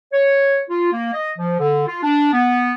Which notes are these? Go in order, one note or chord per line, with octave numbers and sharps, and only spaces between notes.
C#5
F4
A#3
D#5
F3
D3
F4
D4
B3